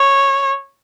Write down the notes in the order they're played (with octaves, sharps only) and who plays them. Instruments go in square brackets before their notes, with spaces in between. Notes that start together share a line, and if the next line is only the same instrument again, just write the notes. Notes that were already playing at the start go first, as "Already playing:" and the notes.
Already playing: [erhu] C#5